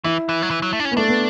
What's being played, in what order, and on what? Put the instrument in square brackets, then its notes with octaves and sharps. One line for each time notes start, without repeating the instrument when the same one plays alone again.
[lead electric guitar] E3 [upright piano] E4
[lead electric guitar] E3
F#3
E3
F#3
A3
D4
C#4
[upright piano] B3
[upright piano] A3 [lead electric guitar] D4
[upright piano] B3